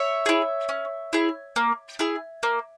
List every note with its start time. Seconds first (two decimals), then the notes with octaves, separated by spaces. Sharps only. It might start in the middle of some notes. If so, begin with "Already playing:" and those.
Already playing: C#5 E5
0.26 E4 G#4
0.69 C#4
1.13 E4 G#4
1.56 A#3
1.99 E4 G#4
2.43 A#3